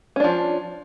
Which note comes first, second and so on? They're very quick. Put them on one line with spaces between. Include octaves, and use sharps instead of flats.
C#4 D4 F3